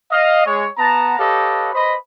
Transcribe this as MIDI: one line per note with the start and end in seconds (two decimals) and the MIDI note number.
0.12 0.43 75
0.12 0.43 77
0.46 0.67 56
0.46 0.67 73
0.79 1.14 59
0.79 1.14 81
0.79 1.14 82
1.19 1.70 67
1.19 1.70 69
1.19 1.70 71
1.19 1.70 73
1.19 1.70 75
1.19 1.70 77
1.74 1.95 71
1.74 1.95 72
1.74 1.95 75
1.74 1.95 83